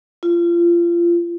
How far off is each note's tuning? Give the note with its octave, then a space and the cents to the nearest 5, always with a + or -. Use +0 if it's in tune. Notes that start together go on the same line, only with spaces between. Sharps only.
F4 -30